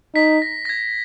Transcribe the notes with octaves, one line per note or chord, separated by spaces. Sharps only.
D#4 B6
A#6
A#6
G#6